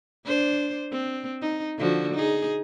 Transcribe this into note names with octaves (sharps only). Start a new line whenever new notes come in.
D4 C5
C4
D#4
D3 F3 F#4
D#4 G#4